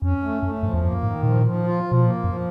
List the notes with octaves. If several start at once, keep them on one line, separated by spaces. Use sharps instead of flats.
F2 C#4
A3
F#2 A3
G2 F3
E2
F2 A#3
F#2
G#2 D#3
A#2 F3
F3
F4
F3
B2
A#2 A#3
F#2 F3